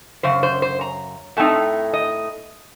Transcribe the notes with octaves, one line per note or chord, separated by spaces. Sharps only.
F#2 C#3 C5
C5
C5
A#5
A2 A3 C4 D#4 A5
D#5